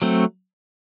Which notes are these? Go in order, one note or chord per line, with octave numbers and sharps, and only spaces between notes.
F#3 A3 C4